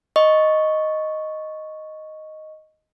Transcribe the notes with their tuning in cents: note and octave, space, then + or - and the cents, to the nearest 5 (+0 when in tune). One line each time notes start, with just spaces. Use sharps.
D#5 +0 C#6 +0